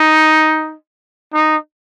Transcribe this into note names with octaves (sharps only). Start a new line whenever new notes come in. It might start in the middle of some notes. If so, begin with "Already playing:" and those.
Already playing: D#4
D#4